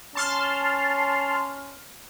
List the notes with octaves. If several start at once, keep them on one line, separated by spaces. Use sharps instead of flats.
C#4 A5 C6 F6